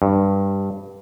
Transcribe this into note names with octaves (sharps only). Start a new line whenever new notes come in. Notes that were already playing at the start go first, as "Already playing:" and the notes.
G2